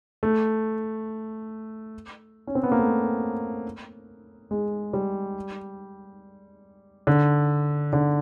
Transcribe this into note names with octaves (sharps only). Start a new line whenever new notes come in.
A3
C#4
C4
B3
A#3
A3
G#3
G3
D3
D3